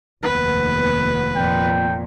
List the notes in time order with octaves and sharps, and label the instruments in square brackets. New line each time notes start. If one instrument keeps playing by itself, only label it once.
[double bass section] F1 D#2 B3 [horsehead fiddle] B4
[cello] F2 A#2 [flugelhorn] G5